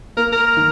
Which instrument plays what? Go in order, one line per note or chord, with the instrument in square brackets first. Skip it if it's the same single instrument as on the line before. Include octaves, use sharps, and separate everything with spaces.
[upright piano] A#3 [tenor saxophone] A#4
[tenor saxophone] A#4
[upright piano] D#3